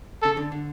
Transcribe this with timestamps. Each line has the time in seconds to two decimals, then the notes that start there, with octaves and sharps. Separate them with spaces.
0.22 C#3 A4
0.37 D3
0.52 D3